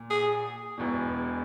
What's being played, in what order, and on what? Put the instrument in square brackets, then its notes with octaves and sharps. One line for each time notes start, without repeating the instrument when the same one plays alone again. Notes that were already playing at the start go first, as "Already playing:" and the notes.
Already playing: [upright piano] A#2
[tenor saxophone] G#4
[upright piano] E1 E2 B2